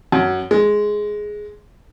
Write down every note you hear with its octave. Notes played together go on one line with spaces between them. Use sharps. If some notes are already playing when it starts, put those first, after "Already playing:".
F#2
G#3